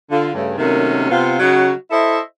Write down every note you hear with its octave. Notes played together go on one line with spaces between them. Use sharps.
D3 F4
G2 C#3 A3
C3 D#3 F#3 A3 A#3 C#4
C3 B3 C4 F4
C#3 F#3 D#4 F#4
E4 A4 C5 D#5 E5